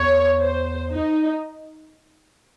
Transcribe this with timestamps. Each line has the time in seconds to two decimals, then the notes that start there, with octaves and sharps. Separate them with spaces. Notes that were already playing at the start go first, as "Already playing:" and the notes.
Already playing: E2 C#5
0.40 C5
0.91 D#4